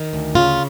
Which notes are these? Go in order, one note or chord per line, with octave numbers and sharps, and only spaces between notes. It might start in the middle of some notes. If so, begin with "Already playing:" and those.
Already playing: D#3
D2
C#3 F4